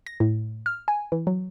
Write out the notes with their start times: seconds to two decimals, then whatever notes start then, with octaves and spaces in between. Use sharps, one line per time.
0.06 A#6
0.20 A2
0.66 F6
0.88 G#5
1.12 E3
1.27 F#3